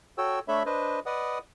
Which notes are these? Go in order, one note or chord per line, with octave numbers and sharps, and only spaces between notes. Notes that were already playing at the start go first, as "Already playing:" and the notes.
F#4 A4 C#5 G5 E6
A3 D4 A4 C#5 E5 B5
D4 B4 C5 D#5
B4 D5 D#5 F#5 D#6